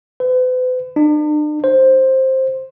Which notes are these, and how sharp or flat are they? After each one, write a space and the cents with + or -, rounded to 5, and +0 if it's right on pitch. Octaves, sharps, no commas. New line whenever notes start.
B4 +45
D4 +45
C5 +10